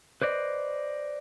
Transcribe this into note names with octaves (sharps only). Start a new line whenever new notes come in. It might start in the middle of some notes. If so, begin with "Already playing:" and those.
B4 C5 D5 D#5